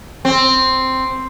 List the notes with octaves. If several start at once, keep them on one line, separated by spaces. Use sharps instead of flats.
C4